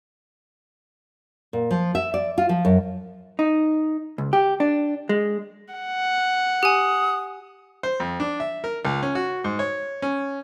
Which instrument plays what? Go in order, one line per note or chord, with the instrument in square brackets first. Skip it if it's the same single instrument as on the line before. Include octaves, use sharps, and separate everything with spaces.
[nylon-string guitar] A#2
F3
E5
D5
F4
F3
F#2
[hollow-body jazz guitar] D#4
C#2
G4
D4
G#3
[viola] F#5
[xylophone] G4 G#5 [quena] D#6
[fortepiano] C5
F2
D4
E5
A#4
C#2
C#4
F#4
G#2
C#5
C#4